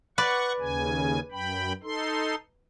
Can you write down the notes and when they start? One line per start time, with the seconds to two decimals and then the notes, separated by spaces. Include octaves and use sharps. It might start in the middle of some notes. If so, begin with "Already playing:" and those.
0.18 B4 D5 F#5 C#6
0.60 D#2 C#3 G#5
1.32 F#2 G5 B5
1.83 D#4 A4 C6